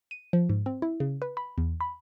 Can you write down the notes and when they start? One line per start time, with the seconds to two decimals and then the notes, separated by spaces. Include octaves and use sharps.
0.11 D#7
0.33 F3
0.49 G#2
0.66 C4
0.82 E4
1.00 C#3
1.22 B4
1.37 B5
1.58 E2
1.81 B5